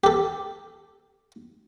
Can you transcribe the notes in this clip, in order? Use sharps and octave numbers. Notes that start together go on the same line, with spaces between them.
G4 A4